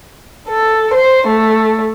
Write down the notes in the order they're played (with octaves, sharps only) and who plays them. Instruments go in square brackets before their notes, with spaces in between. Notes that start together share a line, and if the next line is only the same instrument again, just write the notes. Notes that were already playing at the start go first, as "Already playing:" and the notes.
[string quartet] A4
C5
A3